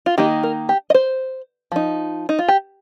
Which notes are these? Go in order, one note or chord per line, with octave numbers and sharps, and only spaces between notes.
F4
D#3 A#3 D#4 G4
A#4
G4
D#5
C5
F3 D#4
D#4
F4
G4